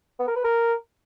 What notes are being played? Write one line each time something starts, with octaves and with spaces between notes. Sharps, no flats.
B3
A#4
B4
A#4